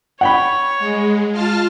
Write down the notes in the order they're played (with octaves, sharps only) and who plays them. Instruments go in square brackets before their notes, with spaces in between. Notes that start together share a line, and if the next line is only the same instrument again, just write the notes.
[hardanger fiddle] C#5 [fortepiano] F#5 G5 B5
[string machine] G#3
F4 A5 F6